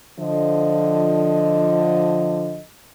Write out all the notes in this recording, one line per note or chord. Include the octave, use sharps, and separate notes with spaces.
D3 F3 D#5